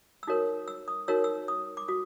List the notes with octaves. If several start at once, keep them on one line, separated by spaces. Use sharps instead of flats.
E6
D#4 F#4 A#4 C#5 D#6
E6
D#6
D#4 F#4 A#4 C#5 E6
E6
D#6
D6
F#4 D#6